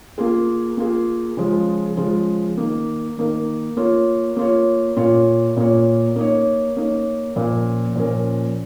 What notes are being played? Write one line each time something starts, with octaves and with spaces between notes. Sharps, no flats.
A#3 F4 G#4
A#3 F4 G#4
C#3 F3 G#3 F4
C#3 F3 G#3 F4
D#3 A#3 D#4 A#4
D#3 A#3 D#4 A#4
A#3 F4 C#5
A#3 F4 C#5
A#2 A#3 F4 C#5
A#2 A#3 F4 C#5
A#3 D#4 C#5
A#3 D#4 C#5
A#2 F3 C#4 A#4
A#2 F3 C#4 A#4